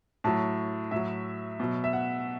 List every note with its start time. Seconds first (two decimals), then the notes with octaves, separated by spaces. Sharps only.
0.24 A2 F#3 A5
0.91 A2 F#3 E5
1.60 B2 F#3
1.84 E5
1.93 F#5